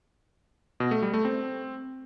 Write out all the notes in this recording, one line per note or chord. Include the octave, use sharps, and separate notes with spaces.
B2
A3
G3
A3
C4